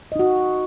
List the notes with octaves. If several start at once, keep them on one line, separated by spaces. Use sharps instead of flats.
D#4 F#4 D#5